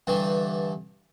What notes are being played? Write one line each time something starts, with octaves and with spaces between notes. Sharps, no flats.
G2 D3 E3 G3